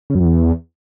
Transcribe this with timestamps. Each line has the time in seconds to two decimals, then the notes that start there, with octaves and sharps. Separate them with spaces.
0.10 C#3
0.15 F#2
0.20 F2
0.25 E2